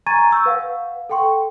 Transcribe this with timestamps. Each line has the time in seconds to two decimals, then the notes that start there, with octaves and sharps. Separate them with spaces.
0.06 G#5 A#5 C#6 G#6 A6 D#7
0.31 C#6 E6 G6
0.46 B4 F5 F#5
1.09 A4 F#5 G5 C6 C#6